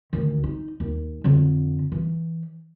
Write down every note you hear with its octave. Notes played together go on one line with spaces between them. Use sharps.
D2 D#3
D#4
D#2
F2 D3
E3